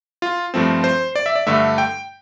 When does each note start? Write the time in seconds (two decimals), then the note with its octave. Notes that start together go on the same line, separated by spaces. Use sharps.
0.22 F4
0.54 G2 F3 A3 C4
0.84 C5
1.16 D5
1.26 E5
1.36 D5
1.47 G2 D3 A3 E5
1.78 G5